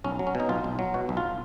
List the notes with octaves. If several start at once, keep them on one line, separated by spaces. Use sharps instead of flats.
B1 C#4
F#3
C#4
B2
D#4
B1 F4
B1
F#3
B2 F#4
B1
F4